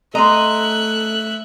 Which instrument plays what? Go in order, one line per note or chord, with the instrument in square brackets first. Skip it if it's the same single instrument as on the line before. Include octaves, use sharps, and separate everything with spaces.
[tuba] A3 [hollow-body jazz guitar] D#5 [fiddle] E5 F#6 [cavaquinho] A#5 C6